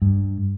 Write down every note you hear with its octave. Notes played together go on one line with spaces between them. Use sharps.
G2